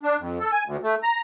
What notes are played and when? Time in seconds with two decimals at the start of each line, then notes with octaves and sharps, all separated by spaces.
0.03 D4
0.19 F2
0.40 A4
0.52 G#5
0.66 D2
0.83 A3
1.03 A#5